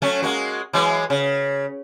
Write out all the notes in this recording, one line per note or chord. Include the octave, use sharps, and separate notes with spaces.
F#3 A3 C#4
G#3 A#3 F#4
E3 F#3 G#3
C#3